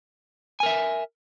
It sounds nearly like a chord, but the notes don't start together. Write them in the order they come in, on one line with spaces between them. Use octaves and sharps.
G#5 A#4 E5